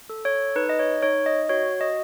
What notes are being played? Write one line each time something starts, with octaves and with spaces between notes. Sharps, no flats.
A4
C#5
D#4 B4
D#5
C#5
D#4 C#5
D#5
F#4 C#5
D#5